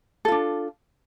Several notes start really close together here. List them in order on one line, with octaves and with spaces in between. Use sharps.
A4 F4 D4